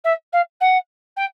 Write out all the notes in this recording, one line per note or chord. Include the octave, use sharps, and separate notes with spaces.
E5
F5
F#5
G5